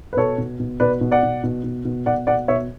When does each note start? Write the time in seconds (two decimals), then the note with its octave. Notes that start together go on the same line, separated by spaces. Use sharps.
0.13 B4
0.17 B2 A4 C#5
0.38 B2
0.60 B2
0.80 B2 B4 D5
1.01 B2
1.11 D5 F#5
1.23 B2
1.44 B2
1.64 B2
1.85 B2
2.06 B2 D5 F#5
2.27 B2 D5 F#5
2.48 B2 C#5 E5